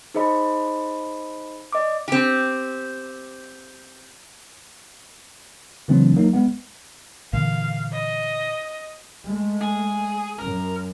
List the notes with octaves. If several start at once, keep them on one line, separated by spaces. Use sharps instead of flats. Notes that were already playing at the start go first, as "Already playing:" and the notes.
D#4 G#4 C5 D#5 B5
D5 D#5 D6
C4 G4
C#3 E3 F#3 A3 C4 D4
F#3 A#3 D#4
G#3 B3 F#5
A#2 D3 E3 F5
D#5
G#3 A3
G#4
F#2 A#4